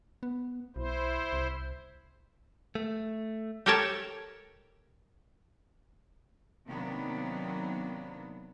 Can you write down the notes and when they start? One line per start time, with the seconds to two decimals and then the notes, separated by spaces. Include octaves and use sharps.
0.23 B3
0.76 B1 E4 C5
1.33 C2
2.75 A3
3.66 G4 A4 A#4 C#5 G5 A5
6.67 C3 D#3 F#3 A#3 B3 D4